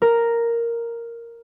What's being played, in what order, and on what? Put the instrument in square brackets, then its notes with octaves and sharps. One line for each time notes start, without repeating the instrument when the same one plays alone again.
[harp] A#4